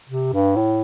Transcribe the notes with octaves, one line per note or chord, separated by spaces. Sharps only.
C3
G2
A2